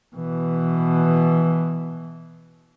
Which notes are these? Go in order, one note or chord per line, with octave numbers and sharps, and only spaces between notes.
B2 E3